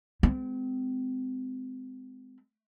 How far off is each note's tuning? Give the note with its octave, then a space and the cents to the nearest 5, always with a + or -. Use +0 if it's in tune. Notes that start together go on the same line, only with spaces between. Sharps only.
G#3 +0 C4 -30